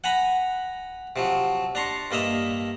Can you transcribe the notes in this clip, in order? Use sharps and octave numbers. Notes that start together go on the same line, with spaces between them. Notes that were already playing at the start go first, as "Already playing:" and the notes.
F#5 G#5 A#5 B5
C3 F3 F#3
D4 A#5 C6 C#6
G2 A#3 D#5 E5 A#5